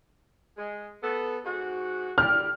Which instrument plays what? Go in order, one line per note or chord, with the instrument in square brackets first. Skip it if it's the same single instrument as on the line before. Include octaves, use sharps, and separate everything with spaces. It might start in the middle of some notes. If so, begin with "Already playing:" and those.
[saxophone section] G#3
B3 A4
G#2 F#4
[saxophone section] D3 G3 [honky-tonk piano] F6